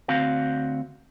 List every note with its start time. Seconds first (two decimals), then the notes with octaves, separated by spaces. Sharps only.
0.08 D2 C4 F#4 F5